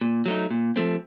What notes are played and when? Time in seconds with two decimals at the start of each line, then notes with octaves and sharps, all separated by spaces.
0.01 A#2
0.26 F#3 A3 D#4
0.51 A#2
0.76 F3 A3 C4